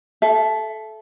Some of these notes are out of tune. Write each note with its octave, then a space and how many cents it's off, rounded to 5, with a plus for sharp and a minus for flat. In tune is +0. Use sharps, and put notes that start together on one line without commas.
A4 -20 E5 +15